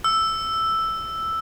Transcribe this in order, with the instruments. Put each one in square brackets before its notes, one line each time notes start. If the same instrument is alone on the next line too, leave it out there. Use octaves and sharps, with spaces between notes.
[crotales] E6